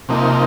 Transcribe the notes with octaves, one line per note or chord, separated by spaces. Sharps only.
C3 F3 A#3 D#4